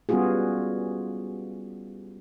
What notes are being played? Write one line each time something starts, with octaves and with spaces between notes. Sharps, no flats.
G3 B3 C#4 F4 F#4 G#4